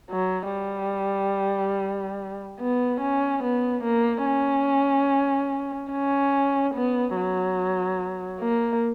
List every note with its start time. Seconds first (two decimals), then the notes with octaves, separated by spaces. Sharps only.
0.11 F#3
0.52 G3
2.60 B3
3.01 C#4
3.43 B3
3.84 A#3
4.26 C#4
5.92 C#4
6.75 B3
7.16 F#3
8.40 A#3